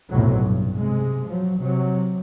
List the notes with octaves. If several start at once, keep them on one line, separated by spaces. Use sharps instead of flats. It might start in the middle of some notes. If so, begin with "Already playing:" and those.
B1 F2 A2 C3 F#3
G2
C3 G#3
F3 F#3
C3 F#3